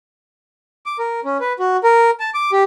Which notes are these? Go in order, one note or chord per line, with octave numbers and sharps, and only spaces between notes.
D6
A#4
C#4
B4
F#4
A#4
A5
D6
G4